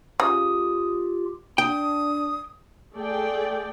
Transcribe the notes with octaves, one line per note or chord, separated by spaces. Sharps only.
C#3 F4 G4 D#6
D4 G5 D#6
A3 G#4 A4 D5 G5